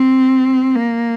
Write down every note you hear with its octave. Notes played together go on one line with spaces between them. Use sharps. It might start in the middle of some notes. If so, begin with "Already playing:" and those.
Already playing: C4
A#3